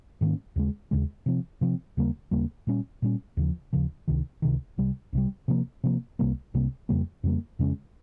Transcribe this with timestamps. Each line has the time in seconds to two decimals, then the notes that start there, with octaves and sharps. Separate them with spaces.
0.21 G#2 D#3 A#3 C#4
0.56 D#2 C#3 G#3
0.91 D#2 C#3 G#3
1.26 C3 F3 C4
1.61 C3 F3 C4
1.97 D#2 C#3 G3 A#3
2.31 D#2 C#3 G3 A#3
2.67 A#2 G3 C#4
3.02 A#2 G3 C#4
3.37 D#2 C#3 F3
3.73 D#2 C#3 F3
4.08 C#2 C3 D#3
4.42 C#2 C3 D#3
4.78 C2 C3 G3
5.13 C2 C3 G3
5.48 C3 F3 A#3
5.84 C3 F3 A#3
6.19 C2 C3 G3 A#3
6.54 C2 C3 G3 A#3
6.89 F2 C#3 G3 A#3
7.24 F2 C#3 G3 A#3
7.59 F2 C#3 G#3 C#4